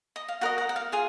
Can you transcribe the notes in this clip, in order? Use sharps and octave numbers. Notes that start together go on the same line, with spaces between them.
D#5
F5
F#4 A#4 D#5 F#5
F#5
F#5
F5
F4 G#4 F5